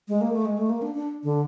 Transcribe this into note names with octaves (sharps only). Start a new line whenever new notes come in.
G#3
A#3
A3
G#3
A3
A#3
D4
D4
D3